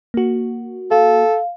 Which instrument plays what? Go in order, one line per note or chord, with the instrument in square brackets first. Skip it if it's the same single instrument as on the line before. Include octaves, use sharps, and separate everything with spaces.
[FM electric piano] A#3 F#4
[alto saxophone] A4 [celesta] F5